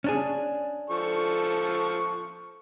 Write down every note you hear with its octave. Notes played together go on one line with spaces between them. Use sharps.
C#4 D4 G#4
F3 A4 C#6